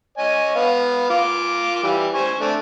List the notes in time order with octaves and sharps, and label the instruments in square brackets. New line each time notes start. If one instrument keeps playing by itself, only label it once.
[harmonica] C#5 D#5 G#5
B3 F5
F4 D6
E3 G3
C5 G#5 C#6
A3 C4 D4